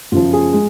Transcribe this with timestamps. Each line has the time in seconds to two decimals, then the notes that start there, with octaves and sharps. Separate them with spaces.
0.12 F#2 C#3 F3 F4
0.33 G#4
0.53 G#3